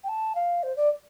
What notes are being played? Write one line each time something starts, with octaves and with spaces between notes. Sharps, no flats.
G5
A5
F5
C5
D5